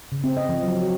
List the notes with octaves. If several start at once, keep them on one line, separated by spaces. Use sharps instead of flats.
C#3
C4
D#5
F3
F#3
F#4